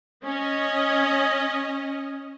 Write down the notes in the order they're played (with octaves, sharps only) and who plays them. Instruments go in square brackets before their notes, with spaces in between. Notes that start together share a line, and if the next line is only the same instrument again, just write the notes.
[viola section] C#4 D#5